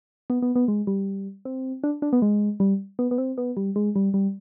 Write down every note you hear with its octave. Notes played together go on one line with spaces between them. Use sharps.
B3
B3
B3
G#3
G3
C4
D4
D4
B3
G#3
G3
B3
B3
C4
B3
G3
G#3
G3
G3